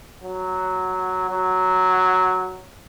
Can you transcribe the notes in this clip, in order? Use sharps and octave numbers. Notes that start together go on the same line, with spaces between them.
F#3
F#3